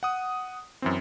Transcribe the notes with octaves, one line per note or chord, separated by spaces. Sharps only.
F#5 D#6
F#2 E3 C4